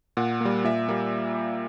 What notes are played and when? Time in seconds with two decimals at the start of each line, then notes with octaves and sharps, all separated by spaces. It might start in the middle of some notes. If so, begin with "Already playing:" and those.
0.17 A#2 F#5
0.41 G3 A#3
0.64 A#2 E5
0.89 G3 A#3